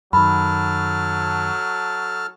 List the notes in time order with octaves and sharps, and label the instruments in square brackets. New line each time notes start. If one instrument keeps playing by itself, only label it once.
[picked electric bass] F#2 D#3 [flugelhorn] F#3 [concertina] A4 A5 F6 [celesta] B5